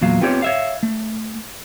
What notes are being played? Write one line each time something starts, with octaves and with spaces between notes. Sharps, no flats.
E2 A#2 F#3 F5
B3 C4 F4 G4 B4 C#5
C#5 E5 F5
A3